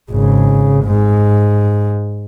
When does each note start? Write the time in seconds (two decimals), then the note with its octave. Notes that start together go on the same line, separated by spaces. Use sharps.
0.12 G#1 C#3
0.85 G#2